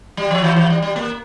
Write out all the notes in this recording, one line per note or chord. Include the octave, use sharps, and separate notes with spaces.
G3
F3
E3
E3
G3
G3
A#3